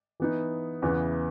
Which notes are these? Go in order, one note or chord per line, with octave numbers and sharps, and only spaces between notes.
E3 B3 D#4
E2 C#3 E3 B3